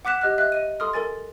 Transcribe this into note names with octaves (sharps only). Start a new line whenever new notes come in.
F#5 D6 F#6 B6 E7
G4 D#5 F6 F#6
D#5 E5 F#6
D#5 D#7
A4 C6 D#6 F6
A4 A#4 G#5 A6